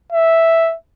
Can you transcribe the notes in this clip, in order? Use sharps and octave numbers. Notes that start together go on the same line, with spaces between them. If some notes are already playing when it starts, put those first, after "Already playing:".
E5